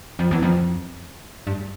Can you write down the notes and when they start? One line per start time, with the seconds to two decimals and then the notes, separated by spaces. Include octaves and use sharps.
0.19 F2
0.31 E2
0.42 F2
1.47 G2